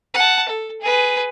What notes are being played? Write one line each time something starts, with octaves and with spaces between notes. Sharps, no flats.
F#5 A5
A4
G#4 B4